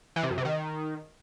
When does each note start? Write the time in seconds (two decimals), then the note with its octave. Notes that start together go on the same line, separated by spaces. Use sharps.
0.16 E3
0.23 C3
0.30 F#2
0.38 C3
0.45 D#3